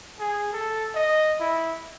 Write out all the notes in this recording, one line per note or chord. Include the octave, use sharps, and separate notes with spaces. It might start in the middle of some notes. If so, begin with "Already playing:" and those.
G#4
A4
D#5
E4